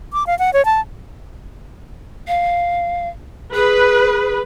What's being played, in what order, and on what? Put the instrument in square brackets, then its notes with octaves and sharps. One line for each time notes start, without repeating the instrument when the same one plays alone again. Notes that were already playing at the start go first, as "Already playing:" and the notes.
[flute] D6
F5
F#5
C#5
A5
[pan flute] F5
[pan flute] G#4 [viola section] B4